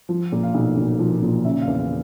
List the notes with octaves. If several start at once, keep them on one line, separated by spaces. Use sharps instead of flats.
F3
A#2
F5
B1
B1
F3
A#2
C#3 E5
F5
E2
F5